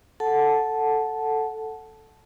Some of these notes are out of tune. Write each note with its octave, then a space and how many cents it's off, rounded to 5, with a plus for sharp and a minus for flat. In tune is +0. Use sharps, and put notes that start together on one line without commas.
A4 +0 F#5 +0 A5 -10